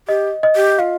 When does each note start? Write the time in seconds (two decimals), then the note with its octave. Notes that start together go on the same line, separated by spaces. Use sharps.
0.08 G4 D#5
0.43 D#5
0.56 G4
0.79 F4 F5